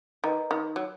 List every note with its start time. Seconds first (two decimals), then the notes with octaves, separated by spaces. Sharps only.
0.24 D#3 B4 D#5 A#5
0.51 D#3
0.76 F#3